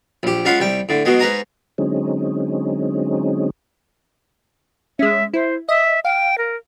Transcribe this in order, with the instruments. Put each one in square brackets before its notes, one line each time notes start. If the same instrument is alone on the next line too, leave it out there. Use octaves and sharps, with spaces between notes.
[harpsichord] A#1 G4
G#3 C#4 F4 F5 F#5 B5
C2 G3 G5
A2 D3
B2 F#3 G#3 B3
G#2 B4 G#5 A#5 D#6
[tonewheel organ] D3 F#3 G#3 C4 C#4 D#4
[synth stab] G#3 C#4 [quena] E5
[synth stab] E4 [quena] C5
[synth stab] D#5 [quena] E5
[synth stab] F5 [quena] G5
[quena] A#4